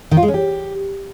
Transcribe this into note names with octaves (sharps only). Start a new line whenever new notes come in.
D#3
F4
G#3
C#4
G4